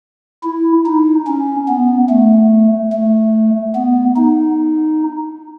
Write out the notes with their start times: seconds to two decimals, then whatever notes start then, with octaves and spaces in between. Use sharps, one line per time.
0.43 E4
0.86 D#4
1.27 C#4
1.69 B3
2.10 A3
2.93 A3
3.75 B3
4.16 D#4